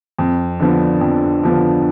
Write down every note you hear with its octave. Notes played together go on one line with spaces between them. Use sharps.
F2
D3 F3 B3
F2
D3 F3 B3